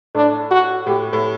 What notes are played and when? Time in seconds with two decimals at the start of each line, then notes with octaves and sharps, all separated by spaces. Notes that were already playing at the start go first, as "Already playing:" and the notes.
0.15 A2 D4
0.51 F#4
0.86 A2 G4
1.13 A2